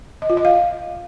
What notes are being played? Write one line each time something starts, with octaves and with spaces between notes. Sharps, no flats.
D#5
F4
D#5
F5